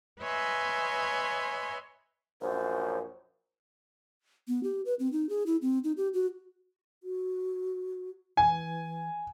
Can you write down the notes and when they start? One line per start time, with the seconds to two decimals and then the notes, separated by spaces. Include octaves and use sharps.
0.21 B4 C#5 D#5 E5 G#5 C6
2.42 A#1 F#2 C5
4.48 B3
4.63 G4
4.85 B4
4.99 C4
5.13 D#4
5.29 G#4
5.46 E4
5.62 C4
5.84 D#4
5.97 G4
6.14 F#4
7.03 F#4
8.37 E3 G#5